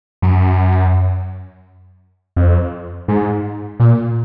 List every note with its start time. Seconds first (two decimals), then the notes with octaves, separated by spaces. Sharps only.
0.22 F#2
2.36 F2
3.08 G#2
3.80 A#2